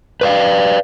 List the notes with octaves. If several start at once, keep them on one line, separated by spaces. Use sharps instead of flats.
B4 D5 F5